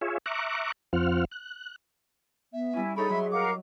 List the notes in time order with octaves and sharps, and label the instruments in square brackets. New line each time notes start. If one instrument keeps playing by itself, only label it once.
[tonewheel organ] F4 G#4 C#5 E5
E5 A#5 C#6 D6 F#6
F2 F3 C4 F4 F#5 F6
F#6
[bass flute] B3 [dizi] E5
[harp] G3 C#4 [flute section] E4 G#5
[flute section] D#4 A4 A5 [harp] E4 C#5 D#5 [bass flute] G#4 [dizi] B5
[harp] F#3 [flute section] E5 C6
[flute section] A#4 F5 F#5 [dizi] D6